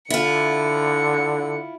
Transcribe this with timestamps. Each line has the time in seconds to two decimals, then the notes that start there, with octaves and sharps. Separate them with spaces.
0.10 D3 E4 F4 C#7